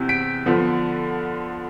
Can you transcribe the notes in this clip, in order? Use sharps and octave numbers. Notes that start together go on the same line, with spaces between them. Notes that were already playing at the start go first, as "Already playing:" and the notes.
Already playing: E2 C3
B6 D7
D3 F3 B3